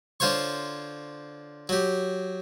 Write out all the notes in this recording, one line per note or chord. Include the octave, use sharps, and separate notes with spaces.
D3 F4 C5 C#5 C#6
F#3 G4